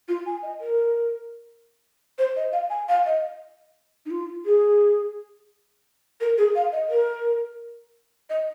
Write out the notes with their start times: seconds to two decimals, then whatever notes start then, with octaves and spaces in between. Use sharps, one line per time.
0.08 F4
0.26 G#5
0.43 D#5
0.61 A#4
2.18 C5
2.36 D#5
2.52 F5
2.70 G#5
2.88 F5
3.06 D#5
4.06 D#4
4.11 F4
4.45 G#4
6.20 A#4
6.38 G#4
6.55 F5
6.72 D#5
6.89 A#4
8.30 D#5